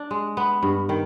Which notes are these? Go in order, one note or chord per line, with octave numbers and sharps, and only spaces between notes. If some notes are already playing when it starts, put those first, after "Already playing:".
Already playing: D4
G#3
B3
G2
D#3